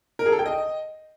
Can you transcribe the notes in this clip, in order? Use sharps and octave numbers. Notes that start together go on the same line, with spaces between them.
A#4
G#4
A4
G5
D#5